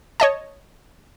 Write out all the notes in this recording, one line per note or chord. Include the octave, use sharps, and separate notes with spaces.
C#5 D#5 A5